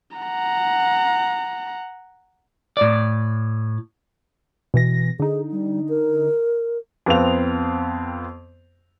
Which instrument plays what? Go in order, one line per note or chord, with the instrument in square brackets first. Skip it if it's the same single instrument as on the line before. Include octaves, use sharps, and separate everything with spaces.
[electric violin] F#5 A#5
[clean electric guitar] A2 D5
[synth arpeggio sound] B2 E3 A#6
[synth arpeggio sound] D3 D#4 [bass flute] G#4
[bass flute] G3
A#4
[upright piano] F2 B3 C4 F5 F7